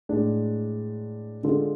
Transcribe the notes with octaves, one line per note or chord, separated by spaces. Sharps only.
A2 G#3 D4
D3 G#3 D4 F4 A4